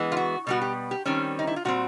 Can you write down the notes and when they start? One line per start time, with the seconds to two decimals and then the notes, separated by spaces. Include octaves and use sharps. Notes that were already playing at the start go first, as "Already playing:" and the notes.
Already playing: E3 G#3 B3
0.12 F4
0.17 F#4
0.47 B2 G3 B3 F#4
0.62 G4
0.91 G4
1.06 D#3 G3 C4 C#4
1.39 D#4
1.47 E4
1.56 F4
1.65 A#2 G3 C4 F#4